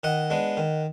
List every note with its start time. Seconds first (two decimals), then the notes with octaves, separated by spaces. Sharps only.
0.03 D#3 D#5 F#5
0.30 G#3 B3 D4
0.57 D#3